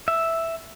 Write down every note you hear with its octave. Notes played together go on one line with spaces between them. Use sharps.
E5